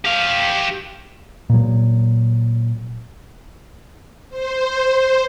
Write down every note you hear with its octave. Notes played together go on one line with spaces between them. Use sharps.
G4 F5
A#2 F#3
C5